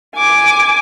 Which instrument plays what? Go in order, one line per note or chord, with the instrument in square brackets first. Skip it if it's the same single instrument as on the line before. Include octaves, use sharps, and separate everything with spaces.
[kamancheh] G#5 D6